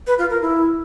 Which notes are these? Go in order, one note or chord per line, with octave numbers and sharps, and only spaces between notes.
B4
F4
A#4
E4